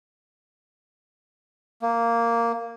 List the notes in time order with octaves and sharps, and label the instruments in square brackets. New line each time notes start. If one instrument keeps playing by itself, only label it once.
[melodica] A#3